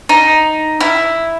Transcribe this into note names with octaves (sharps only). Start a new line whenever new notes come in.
D#4
E4